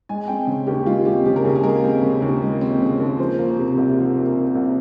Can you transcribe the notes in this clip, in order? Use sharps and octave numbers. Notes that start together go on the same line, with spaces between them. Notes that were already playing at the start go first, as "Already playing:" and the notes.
G#3 G#5
C4 G5
C#3
D#2 G4
G#3 F4
C4 G4
C#3 G4
A#4
D#2 G#4
G#4
G#3 A#4
C4
C#3
D#2
G#3
C4
C#3
D#2
F3 C5
A#3
C3
C2
F3
A#3
C3
C2